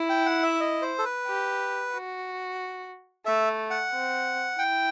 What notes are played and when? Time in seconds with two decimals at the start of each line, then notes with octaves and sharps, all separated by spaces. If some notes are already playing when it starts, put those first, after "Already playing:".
Already playing: E4
0.09 G5
0.26 F#5
0.43 E5
0.60 D#5
0.82 C5
0.98 A4
1.05 B4
1.27 G4
1.93 F#4
3.26 A3 E5
3.70 F#5
3.92 C4
4.58 E4 G5